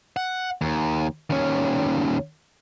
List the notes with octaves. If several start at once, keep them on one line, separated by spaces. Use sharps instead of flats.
F#5
D#2
D#2 C#4